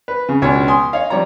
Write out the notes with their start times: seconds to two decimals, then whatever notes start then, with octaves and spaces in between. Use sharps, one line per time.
0.08 B4
0.29 C#3
0.42 C#2 B2 D4 C#5 G#5
0.68 G#5 C6 D#6
0.93 C#5 D#5 F5
1.10 F3 G3 C#5 D5 A#5